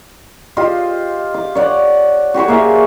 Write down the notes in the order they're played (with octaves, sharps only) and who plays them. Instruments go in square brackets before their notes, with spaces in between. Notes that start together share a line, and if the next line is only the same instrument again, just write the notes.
[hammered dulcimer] F4 G4 C5 D#5
D6
C#5 D5 F#5
F#4 G4 C5 C#5
A#3 G#4 E5 G#5